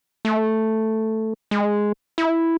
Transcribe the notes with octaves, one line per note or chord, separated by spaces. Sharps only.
A3
G#3
E4